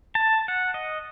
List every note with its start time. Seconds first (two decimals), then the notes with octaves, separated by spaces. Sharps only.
0.15 A5
0.48 F#5
0.74 D#5